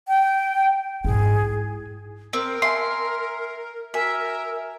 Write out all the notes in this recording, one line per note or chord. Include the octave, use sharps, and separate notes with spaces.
G5
G#2 E4 G#4
C4 A#4 D7
E5 G#5 C6
F#4 A#4 E5 G#5